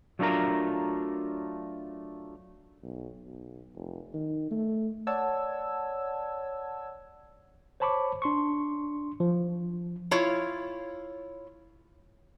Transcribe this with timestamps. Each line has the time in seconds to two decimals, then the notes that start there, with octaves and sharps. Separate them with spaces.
0.19 F#3 A3 D4 F4 A#4 A#5
2.83 B1
3.25 B1
3.76 F1
4.14 D#3
4.51 A3
5.07 C#5 D5 F#5 A5 E6 G#6
7.80 C5 C#5 A5 B5 C#6 D6
8.22 D4 C6 C#6
9.20 F3
10.11 E4 F4 C#5